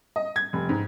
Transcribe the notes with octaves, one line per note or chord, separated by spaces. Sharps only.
D#5
G#6
F1
G#2